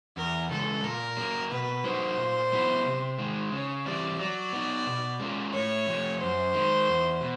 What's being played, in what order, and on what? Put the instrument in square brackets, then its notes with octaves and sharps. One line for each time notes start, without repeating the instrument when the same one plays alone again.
[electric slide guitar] E2 [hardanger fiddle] A#4
[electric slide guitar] C#3 E3 G#3 [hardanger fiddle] A4
[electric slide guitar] A#2 [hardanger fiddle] A#4
[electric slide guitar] F#3 A#3
[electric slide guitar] B2 [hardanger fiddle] B4
[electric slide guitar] F#3 A#3 D#4 F#4 [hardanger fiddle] C5
[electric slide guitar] A#2
F#3 B3 E4
C3
D#3 G#3
[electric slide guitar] C#3 [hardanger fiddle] C#5
[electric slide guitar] E3 G3 C4 [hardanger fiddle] D5
[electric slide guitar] F#3 [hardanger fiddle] D5
[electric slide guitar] B3 D#4
B2
G#3 C#4 F4 A#4
[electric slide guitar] A2 [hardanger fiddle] C#5
[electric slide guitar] F3 A3
[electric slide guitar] F#2 [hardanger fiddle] C5
[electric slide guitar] D#3 G#3
E2
B2